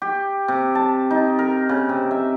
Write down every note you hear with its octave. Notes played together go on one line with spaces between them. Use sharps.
G4
C3
A5
D#4
A#4
C#3
C3
E5